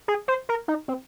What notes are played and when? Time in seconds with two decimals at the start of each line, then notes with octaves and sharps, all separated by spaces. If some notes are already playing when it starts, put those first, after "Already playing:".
0.08 G#4
0.28 C5
0.49 A#4
0.68 D#4
0.88 C4